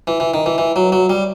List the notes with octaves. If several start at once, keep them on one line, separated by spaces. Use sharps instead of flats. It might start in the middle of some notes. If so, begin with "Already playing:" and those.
E3
E3
D#3
E3
E3
F#3
F#3
G3